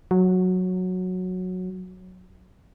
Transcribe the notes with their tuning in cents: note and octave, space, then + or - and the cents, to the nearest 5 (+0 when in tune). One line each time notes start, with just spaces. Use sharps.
F#3 -10